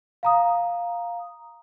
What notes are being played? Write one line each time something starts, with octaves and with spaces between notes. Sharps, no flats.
F5 A#5 D#6